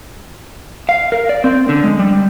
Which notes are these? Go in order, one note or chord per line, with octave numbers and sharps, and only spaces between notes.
F5
A#4
D5
C4
D3
G#3
G3